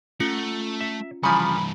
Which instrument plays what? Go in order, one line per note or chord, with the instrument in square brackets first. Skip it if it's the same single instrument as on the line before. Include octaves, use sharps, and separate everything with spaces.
[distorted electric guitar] A3 [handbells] C#4 F4 C#7
[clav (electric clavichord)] E5
[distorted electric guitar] G2 E3 [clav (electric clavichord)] C#3 F3 [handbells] G#5 A#5 [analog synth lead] B5